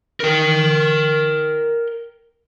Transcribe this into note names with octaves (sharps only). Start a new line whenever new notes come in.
A#4 G5